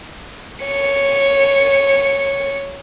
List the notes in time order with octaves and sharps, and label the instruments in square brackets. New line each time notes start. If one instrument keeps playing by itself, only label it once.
[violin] C#5 C#7